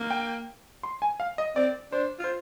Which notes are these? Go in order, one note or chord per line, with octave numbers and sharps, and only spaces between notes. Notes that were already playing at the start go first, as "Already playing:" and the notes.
Already playing: A#3
G5
C6
G#5
F5
D#5
C4 D5
D4 C5
F4 C5